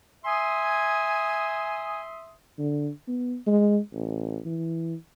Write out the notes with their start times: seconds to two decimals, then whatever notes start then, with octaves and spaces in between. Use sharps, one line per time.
0.25 E5 G#5 C6 D#6
2.58 D3
3.08 B3
3.47 G#3
3.93 A1
4.45 E3